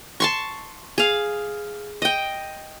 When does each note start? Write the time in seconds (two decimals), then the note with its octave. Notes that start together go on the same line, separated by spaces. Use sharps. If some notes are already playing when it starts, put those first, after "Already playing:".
0.20 A5 C6 C#6
0.98 G#4 F5
2.02 D#5 G5